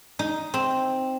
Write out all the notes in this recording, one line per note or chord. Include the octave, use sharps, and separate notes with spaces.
D#4
C4